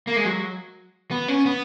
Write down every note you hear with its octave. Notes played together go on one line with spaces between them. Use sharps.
A#3
G#3
F#3
B3
C#4
B3